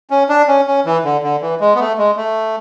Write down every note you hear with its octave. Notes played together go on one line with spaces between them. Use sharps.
C#4
D4
C#4
C#4
E3
D3
D3
E3
G#3
B3
A3
G#3
A3